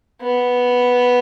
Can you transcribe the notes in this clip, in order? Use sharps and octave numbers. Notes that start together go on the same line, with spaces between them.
B3